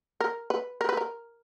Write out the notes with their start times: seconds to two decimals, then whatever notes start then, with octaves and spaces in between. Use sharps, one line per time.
0.21 A#4
0.50 B4
0.81 A#4
0.89 B4
0.97 A#4